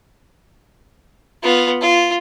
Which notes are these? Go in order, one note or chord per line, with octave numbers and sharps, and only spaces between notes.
B3 F4
F4